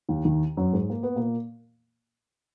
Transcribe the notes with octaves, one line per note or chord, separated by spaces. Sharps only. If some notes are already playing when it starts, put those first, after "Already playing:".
D#2 D#3
D#2 D#3
F#2 F#3
G#2 G#3
A#3
B3
A#2 A#3